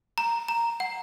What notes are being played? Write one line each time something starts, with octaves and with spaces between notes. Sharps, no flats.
A#5
A#5
F#5